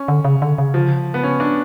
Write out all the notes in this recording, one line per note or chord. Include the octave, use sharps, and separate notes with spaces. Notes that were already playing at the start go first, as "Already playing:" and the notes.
Already playing: C#4
D3
C#3
D3
C#3
F3
B3
C#4
D4